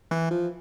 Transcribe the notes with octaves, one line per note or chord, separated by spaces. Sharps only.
E3
F3